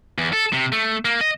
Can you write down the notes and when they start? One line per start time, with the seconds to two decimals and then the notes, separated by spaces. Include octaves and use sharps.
0.18 E2
0.33 A4
0.53 C3
0.72 A3
1.05 A#3
1.21 D#5